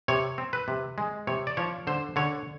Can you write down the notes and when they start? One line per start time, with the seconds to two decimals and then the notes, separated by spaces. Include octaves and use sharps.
0.08 C3 C#5
0.38 C4
0.53 B4
0.68 C3
0.98 G#3
1.27 C3 C#5
1.47 D5
1.57 F3 C#5
1.87 D3 C5
2.16 D3 C#5